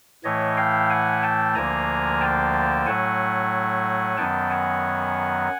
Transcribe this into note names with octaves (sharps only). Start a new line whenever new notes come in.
A2 E3 A3 C#5 D#5
F5 G5
F#5 G#5
G5 A5
D2 D3 F3 A#3 G#5 A#5
G5 A5
A2 F#3 A3 F#5 G#5
F#2 D#3 F#3 B3 G5 A5
F#5 G#5